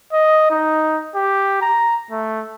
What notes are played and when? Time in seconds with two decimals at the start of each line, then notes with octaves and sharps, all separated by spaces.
0.12 D#5
0.50 D#4
1.15 G4
1.62 A#5
2.11 A3